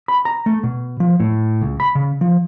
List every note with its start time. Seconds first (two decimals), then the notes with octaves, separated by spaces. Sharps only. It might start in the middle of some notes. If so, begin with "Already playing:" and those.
0.08 B5
0.25 A#5
0.46 A3
0.63 B2
1.00 F3
1.20 A2
1.61 C#2
1.80 B5
1.95 C#3
2.21 F3